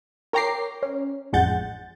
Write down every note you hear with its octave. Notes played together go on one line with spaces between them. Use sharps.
A#4 C#5 G5 A#5 D6 C7
C#4
A1 F2 G#3 F#5 G6 A6